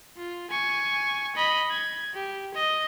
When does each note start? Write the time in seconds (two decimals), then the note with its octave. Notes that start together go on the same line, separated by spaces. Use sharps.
0.17 F4
0.51 G#5 C#6
1.36 D#5 B5
1.71 G#6
2.14 G4
2.55 D#5